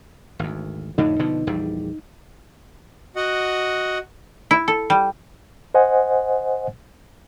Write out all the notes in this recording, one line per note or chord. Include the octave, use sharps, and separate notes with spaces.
G#1 D2
F2 A2 D3 D#4
B2 D3 F3
A#1 E2 G3
F#4 D#5 F#5
E4
A4
G3
C5 D#5 F#5 G#5